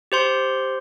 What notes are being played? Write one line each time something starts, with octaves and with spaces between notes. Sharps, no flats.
G4 C5 C6